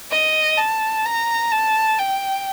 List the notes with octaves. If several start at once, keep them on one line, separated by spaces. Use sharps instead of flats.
D#5
A5
A#5
A5
G5